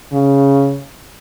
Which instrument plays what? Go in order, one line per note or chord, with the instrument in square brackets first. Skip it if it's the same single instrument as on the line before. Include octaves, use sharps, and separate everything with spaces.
[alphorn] C#3